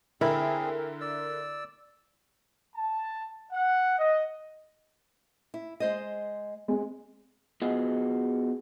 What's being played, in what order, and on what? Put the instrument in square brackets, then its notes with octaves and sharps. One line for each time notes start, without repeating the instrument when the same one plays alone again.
[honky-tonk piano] D3 A#4 E5 [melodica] C4 G#4 [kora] E4
[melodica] D5 E6
[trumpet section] A5
F#5
D#5
[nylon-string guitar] E4
G#3 C5 D#5
[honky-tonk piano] G#3 C4 G#4
[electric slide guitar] B3 F4 F#4 G#4 D#5